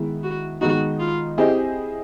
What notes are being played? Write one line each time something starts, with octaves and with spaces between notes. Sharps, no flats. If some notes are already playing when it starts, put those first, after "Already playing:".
Already playing: D#3 G#3 B3 E4
F#4
D#3 G#3 B3 D#4 F#4
F4
C4 E4 G4 G#4 C5 D#5